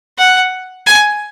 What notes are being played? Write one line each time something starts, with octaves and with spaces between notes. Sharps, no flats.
F#5
G#5